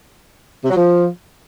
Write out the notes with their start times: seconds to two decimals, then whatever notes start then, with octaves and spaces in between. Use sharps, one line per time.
0.64 C3
0.71 F#3
0.77 F3